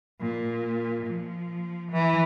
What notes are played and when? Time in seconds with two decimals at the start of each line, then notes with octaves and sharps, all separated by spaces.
0.20 A#2
1.06 F3
1.91 E3